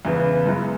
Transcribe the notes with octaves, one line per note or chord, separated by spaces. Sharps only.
E2 C#3 E3 B3
F#2 E3 G#3